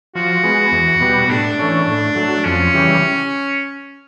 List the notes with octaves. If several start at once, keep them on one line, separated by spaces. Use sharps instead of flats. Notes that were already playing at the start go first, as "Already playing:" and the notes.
F3 F#4
G#3 B3
E2
B2 G3 B3
A2 D4
E3 A3 C#4
A2
F#3 A3
F2 C#4
C#3 E3 G3